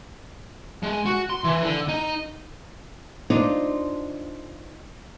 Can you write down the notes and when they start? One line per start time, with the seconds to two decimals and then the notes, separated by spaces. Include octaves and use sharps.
0.83 G#3
1.06 F#4
1.30 C6
1.44 E3
1.63 D3
1.88 D#4
3.30 D4 D#4 F4 C5